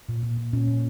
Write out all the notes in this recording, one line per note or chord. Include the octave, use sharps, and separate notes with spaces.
A#2
A#2
A#2
A#2 C#4
A#2